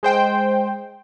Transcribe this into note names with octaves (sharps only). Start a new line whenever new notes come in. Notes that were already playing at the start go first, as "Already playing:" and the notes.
G#3 C5 G5